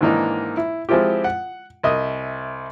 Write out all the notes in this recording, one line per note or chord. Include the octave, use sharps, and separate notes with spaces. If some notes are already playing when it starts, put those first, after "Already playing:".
G#2 D#3 E3 A#3 D4 D#4
E4
F3 G#3 C4 E4 F4 G4
F#5
C2 D#5 E5 D#6